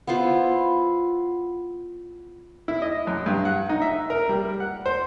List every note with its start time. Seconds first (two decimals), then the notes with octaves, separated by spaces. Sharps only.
0.07 B3 E4 F4 C5
2.68 E4
2.82 D#5
3.07 F#2
3.26 G2
3.45 F#5
3.69 D#4
3.82 E5
4.10 A#4
4.29 G3
4.60 F#5
4.86 C5